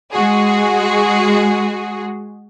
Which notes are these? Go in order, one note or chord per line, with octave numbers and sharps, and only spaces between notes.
G#3 F#4 G#4